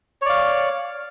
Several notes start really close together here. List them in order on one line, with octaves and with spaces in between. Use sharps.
C#5 D5 F5